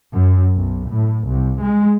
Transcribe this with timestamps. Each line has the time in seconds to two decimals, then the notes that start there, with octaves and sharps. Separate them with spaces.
0.12 F#2
0.55 B1
0.89 A2
1.27 C2
1.61 G#3